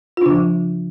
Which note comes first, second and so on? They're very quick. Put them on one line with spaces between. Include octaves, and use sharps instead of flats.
F4 D4 C#3 F3